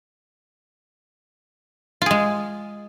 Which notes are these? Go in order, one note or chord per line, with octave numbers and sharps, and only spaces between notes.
G#3 F4 G#4